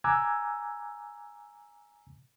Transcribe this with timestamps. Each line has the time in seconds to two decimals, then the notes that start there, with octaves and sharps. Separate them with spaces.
0.04 G#5 A#5 D6 E6 F#6 G#6